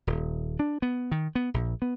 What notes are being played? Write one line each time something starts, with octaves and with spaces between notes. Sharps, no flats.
D#1
D4
B3
D#3
B3
A#1
B3